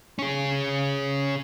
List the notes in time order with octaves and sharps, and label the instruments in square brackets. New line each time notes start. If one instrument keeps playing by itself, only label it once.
[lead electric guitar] C#4 G#4